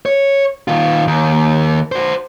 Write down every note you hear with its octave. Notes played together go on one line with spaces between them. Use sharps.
C#5
D#3 F4
D#2
F#4 C5